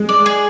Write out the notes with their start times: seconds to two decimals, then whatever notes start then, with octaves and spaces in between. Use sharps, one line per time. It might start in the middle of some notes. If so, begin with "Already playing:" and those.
Already playing: G#3
0.09 D5
0.26 G#4